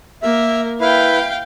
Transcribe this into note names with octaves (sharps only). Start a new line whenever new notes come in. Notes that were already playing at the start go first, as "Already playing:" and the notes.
A#3 A#4 E5
E4 B4 F5 G5